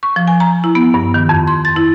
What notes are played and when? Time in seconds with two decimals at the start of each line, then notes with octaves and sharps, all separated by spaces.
0.03 C#6
0.16 F3
0.28 G#5
0.40 A#5
0.64 E4
0.75 B3
0.94 G2
1.14 D#3
1.29 F2
1.47 C6
1.65 A6
1.76 E4